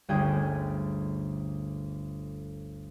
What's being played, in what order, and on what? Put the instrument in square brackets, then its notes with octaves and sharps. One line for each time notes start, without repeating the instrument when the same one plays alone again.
[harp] G1 D2 C#4 G#4 G5 G#6